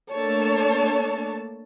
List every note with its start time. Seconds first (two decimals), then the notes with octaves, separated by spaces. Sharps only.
0.11 A3 A#3 D4 C#5 A5